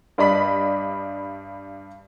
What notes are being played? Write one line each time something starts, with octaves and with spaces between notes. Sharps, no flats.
G2 D5 D#5 B5 B6